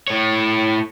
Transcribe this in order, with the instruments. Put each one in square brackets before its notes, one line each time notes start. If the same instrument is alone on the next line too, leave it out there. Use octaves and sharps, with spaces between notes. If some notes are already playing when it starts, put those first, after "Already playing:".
[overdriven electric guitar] A2 C#5